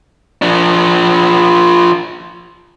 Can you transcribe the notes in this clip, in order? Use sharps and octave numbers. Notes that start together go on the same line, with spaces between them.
F3 D4